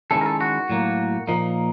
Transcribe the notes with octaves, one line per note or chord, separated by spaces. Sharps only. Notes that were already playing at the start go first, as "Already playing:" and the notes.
D#3 G#3 C#4 E4 A4
A#4
A4
F#4
A2 F#3 A#3
A#2 F3 A#3 D#4